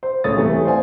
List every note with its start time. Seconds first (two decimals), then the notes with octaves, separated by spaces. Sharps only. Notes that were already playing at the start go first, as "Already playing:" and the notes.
0.03 C5
0.24 C#2 A3 C#5 D#6 A6
0.37 C3 E3 A3
0.65 C5 D5 F5 G#5